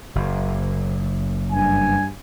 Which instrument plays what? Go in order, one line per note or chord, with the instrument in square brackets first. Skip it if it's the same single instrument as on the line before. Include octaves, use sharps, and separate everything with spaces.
[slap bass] F#1
[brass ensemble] G2 G#5